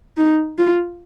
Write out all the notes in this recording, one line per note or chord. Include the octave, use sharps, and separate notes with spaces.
D#4
F4